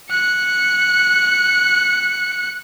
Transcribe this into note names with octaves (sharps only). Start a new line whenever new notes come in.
F#6 C#7